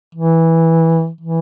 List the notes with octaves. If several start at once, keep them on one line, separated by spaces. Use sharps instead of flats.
E3
E3